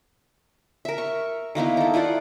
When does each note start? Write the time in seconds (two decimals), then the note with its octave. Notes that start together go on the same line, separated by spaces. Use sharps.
0.85 A#4 E5
0.98 C#6
1.55 D#3 A#3 B3 E4
1.77 D#4 A4
1.94 E4 F4 D5 F#5